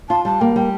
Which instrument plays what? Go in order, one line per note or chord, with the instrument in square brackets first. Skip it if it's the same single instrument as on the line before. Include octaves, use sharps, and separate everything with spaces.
[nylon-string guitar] F4 [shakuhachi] A5
[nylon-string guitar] G3 [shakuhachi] A5
[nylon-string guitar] A#3 [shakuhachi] G5
[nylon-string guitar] G3 [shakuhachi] G5